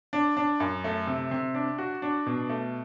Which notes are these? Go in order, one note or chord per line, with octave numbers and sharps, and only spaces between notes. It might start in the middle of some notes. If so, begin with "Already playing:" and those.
D4
D4
F#2
A3
C3
C3
D4
F#4
D4
B2
A3